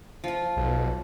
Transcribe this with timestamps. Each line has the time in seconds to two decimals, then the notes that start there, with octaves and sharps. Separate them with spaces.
0.24 F3 F4
0.57 B1